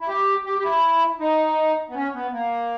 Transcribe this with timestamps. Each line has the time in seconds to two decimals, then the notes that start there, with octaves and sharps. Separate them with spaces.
0.01 E4
0.08 G4
0.45 G4
0.58 G4
0.64 E4
1.20 D#4
1.89 B3
1.95 C#4
2.14 B3
2.33 A#3